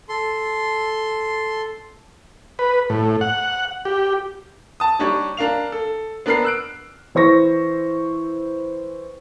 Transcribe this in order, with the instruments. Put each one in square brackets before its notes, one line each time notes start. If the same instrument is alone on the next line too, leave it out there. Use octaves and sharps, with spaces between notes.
[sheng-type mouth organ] A4 C6
[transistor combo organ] B4
A2
F#5
G4
[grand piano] A5 D#6
G3 D4 D#4 G4 C#5
D4 A#4 F5 F7
A4
B3 D4 A#4 B5 F6 C7
E6 F#6 D7
[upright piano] E3 C5 C#6 A#6